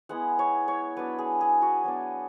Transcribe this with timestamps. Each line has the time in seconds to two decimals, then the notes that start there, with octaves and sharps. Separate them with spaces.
0.09 G#3 B3 E4 F#5
0.39 C#5
0.68 C#5
0.97 F#3 B3 D4 B4
1.19 G#4
1.41 G#4
1.62 F#4
1.84 F#3 B3 D4